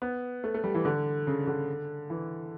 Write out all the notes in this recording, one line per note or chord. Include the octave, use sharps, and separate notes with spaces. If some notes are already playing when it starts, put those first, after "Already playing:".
B3
A3
A3
G3
E3
D3
C#3
D3
E3